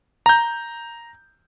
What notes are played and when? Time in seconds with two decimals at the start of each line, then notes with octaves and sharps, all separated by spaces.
0.26 A#5 G6